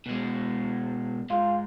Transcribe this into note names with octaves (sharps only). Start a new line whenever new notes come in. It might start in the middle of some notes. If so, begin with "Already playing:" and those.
B2 G#3
G#2 F4